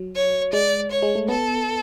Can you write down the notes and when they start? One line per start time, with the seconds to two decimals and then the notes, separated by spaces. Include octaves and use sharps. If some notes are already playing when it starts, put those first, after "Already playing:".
Already playing: F#3
0.15 C#5
0.53 G#3 D5
0.91 C#5
1.02 G#3
1.15 A3
1.28 B3 A4